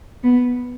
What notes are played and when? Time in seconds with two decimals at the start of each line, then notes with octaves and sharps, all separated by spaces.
0.24 B3